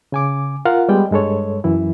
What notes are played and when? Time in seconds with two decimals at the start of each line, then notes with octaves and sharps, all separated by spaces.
0.12 C#3 G#5 D6
0.65 F4 A#4 F5 F#5
0.89 G3 G#3 B3 D5 G5
1.11 G2 G#3 A4 C#5
1.64 F#2 E3 E4